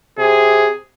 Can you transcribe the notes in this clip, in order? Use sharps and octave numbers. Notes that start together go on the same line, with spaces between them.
C3 G#4